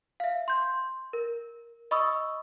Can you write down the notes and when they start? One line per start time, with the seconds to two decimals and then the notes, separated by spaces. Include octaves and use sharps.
0.20 E5 F5
0.48 C6 G6
1.13 A#4
1.91 D#5 B5 C#6 D#6 E6